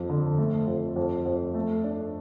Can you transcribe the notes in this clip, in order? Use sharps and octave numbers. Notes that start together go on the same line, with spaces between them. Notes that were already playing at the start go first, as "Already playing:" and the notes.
Already playing: F2
D3
A3
F2
F2
F2
A3
D4